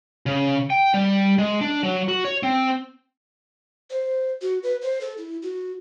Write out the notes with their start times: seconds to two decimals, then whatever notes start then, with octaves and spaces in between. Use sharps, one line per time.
0.26 C#3
0.70 G5
0.94 G3
1.38 G#3
1.61 D4
1.83 F#3
2.08 F#4
2.25 C#5
2.43 C4
3.90 C5
4.42 F#4
4.63 B4
4.82 C5
5.01 A4
5.18 E4
5.42 F#4